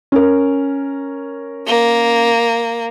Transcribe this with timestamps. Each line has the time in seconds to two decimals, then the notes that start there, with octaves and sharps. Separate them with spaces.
0.12 C#4 A#4
1.67 A#3